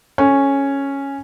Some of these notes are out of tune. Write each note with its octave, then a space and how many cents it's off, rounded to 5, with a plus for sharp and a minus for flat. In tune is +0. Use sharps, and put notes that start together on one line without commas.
C#4 -5 A4 +0